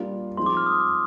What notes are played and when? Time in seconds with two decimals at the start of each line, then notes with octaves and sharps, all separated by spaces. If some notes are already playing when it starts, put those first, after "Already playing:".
Already playing: G3 A#3 D4 F4
0.37 F3 G#3 C4 D#4 C6
0.46 D6
0.57 F6
0.66 D#6
0.80 D6